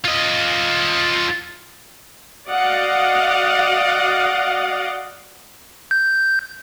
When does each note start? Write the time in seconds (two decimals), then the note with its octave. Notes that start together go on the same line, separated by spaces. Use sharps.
0.04 F4 D#5
2.48 F#4 D5 D#5 F5 F#5
5.91 G6